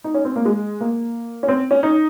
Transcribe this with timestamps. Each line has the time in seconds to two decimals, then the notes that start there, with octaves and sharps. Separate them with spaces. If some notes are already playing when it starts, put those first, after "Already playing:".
0.04 D#4
0.14 C#4
0.25 C4
0.36 A#3
0.45 G#3
0.81 A#3
1.43 C#4
1.48 C4
1.71 C#4
1.83 D#4